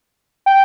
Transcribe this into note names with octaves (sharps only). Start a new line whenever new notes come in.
G5